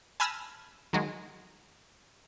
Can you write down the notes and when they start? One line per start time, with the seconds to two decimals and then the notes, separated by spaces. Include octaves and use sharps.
0.20 G#5 A5 B5 E6 F6 A#6
0.93 D#3 F#3 G#3